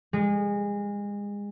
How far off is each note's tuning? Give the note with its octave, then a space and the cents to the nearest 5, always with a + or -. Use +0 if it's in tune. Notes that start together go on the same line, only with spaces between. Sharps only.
G#3 -30